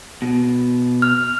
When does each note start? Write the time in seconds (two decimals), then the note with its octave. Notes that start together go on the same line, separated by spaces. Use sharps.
0.22 B2
1.02 F6